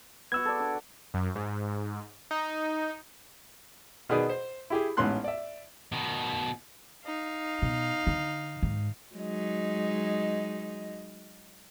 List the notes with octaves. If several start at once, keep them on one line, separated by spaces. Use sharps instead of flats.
B3 F#4 E6 G#6
A4 D5
D4
F#2
G#2
D#4
B2 D#3 G#4 B4 D5 D#6
C5
E4 G4 G#4
A1 G#2 B3 C#4 C6 F#6
D5 E5
B2 D#3
D#4 F5
B2
D3
G#2 D#3
F#3 G#3 D#4